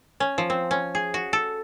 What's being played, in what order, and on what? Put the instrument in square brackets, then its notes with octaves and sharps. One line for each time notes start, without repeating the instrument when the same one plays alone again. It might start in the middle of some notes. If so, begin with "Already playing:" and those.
[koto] C#4
F3
C4
C#4
G#4
F#4
A4